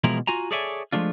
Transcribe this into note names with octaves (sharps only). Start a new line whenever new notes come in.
B2 E3 F3 G#3 E4 A#4
F4 F#4 G#5 A#5
G#4 A4 C#5 D5 E5 G#5
F3 G#3 A3 D4 F4